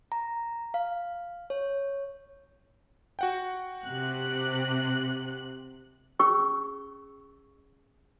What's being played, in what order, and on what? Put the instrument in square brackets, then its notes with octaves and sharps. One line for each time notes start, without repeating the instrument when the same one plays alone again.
[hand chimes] A#5
F5
C#5
[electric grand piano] F#4 F#5 G5
[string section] C3 F#6
[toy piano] C#4 G#4 C#6 E6